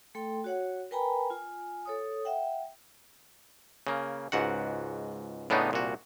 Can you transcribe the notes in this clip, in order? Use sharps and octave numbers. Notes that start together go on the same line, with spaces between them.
A3 A4 G5 C6
F#4 C#5 F#5
A#4 B4 G5 G#5 A#5 B5
F4 G#5
A4 C#5 D#6
E5 F#5 G5
C#3 A#3
C#2 G#2 F#4 F#5
A2 C#3 B3 D4 D#4
C2 A#2 F#4